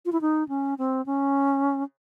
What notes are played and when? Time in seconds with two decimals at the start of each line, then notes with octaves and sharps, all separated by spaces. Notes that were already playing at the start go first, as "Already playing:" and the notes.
0.06 F4
0.12 E4
0.21 D#4
0.49 C#4
0.78 C4
1.06 C#4